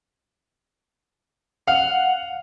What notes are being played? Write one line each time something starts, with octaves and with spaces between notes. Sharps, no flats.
F5 F#5